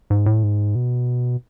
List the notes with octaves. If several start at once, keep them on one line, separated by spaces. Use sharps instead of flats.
G#2
A2
G#2
B2